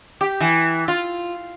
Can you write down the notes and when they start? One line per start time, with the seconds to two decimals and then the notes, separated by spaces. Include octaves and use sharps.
0.21 G4
0.40 E3
0.88 F4